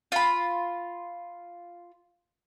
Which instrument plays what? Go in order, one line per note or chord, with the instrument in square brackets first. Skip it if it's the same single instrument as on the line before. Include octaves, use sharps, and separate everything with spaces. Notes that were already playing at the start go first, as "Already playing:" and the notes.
[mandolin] F4 B5